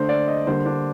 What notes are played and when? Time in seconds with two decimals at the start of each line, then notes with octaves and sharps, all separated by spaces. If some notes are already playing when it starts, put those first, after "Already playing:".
Already playing: D3 A3 D4 C5
0.09 D5
0.28 D#5
0.47 D3 G3 A#3 D4 C5
0.66 D4